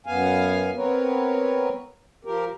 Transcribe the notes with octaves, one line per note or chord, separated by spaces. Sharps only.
F#2 B3 F5 G#5
B3 C4 A#4 B4 C#5
F3 G4 A#4